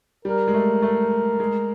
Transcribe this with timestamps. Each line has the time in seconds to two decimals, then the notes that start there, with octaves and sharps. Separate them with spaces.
0.25 G3 A#4
0.48 G#3
0.54 A3
0.82 A3
1.40 G#3